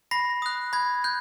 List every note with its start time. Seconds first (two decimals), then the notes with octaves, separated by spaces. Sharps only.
0.11 B5 A#6 C7
0.42 D#6 F#6
0.73 B5 G#6
1.04 F#6 G6